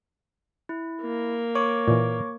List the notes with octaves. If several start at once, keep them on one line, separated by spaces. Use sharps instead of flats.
E4
A#3
C#5 C#6 D6
A#2 E3